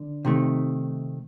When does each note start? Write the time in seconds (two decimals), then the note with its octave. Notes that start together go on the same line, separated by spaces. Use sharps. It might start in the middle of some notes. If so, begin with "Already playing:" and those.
Already playing: D3
0.25 C3 D#3 A3